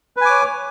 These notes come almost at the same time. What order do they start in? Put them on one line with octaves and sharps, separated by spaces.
B4 G#5 D6 C#5